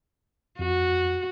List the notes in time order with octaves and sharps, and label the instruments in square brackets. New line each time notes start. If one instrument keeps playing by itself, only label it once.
[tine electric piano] F2 [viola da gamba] F#4